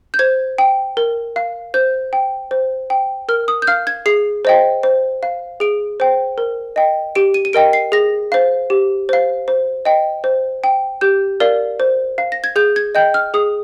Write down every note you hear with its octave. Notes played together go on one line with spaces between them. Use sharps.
G6
C5 G#6
G5
A#4
F5
C5 G6
G5
C5
G5
A#4 F6
D#6
G6
F5 F6
G#6
G#4 C7
C5 D#5 G5
C5
F5
G#4 D7
C5 G5
A#4
D#5 G5
G4 D7
D#7
D#7
A#4 D#5 G5 D7
C7
G#4 A#6
C5 F5
G4
C5 F5
C5
D#5 G5
C5
G5
G4 G6
A#4 D5 F5
C5
F5
A#6
G#6
G#4 G6
G#6
D#5 G5 G6
F6
G#4 D#6